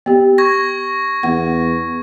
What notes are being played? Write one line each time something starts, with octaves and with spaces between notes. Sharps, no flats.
B3 G4
C#6 G#6 A#6
E2 F#5